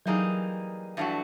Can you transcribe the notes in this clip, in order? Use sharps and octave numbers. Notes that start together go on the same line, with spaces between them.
E3 F#3 G3 A#3 D#4 G#4
G2 E3 A3 D4 F#4